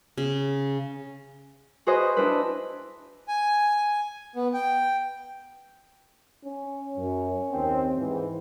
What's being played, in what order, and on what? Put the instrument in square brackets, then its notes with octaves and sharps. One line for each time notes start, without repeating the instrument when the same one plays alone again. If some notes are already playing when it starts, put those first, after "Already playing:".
[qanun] C#3
[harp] F#4 G#4 B4 C5 D#5
D4 E4 B4
[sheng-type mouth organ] G#5
B3
G5
[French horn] C#4
[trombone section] F#2
D#2 C4
[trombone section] G#2 [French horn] E3